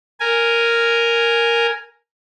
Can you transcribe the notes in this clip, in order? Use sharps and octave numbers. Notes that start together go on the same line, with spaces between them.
A#4 G#5